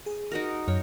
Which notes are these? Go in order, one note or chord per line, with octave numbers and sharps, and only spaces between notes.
G#4
D#4 F#4 A#4
F#2 C#5